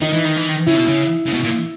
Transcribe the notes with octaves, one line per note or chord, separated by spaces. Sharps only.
D#3 D#4
E3
D#3
E3
D#3
C#3 E4
B2
C#3
C#3
B2
A#2